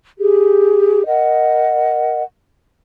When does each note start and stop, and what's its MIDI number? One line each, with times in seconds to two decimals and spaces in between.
0.18 1.06 67
0.18 1.06 68
1.06 2.23 70
1.06 2.23 75
1.06 2.23 78